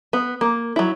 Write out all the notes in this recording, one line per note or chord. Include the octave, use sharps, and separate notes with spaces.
B3
A#3
F#3 E4